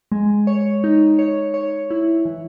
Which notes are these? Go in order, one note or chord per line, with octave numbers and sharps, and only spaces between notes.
G#3
C#5
D#4
C#5
C#5
E4
E3